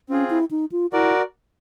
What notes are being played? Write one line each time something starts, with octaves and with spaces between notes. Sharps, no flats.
C4 C#4 F4 G#4
E4
D#4
F4
E4 F#4 A#4 D5